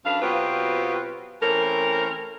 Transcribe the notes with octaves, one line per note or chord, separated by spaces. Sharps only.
F#2 D4 A4 B4 F5
B2 F#3 C4 F4 G4 B4
E3 A3 C4 C#4 A#4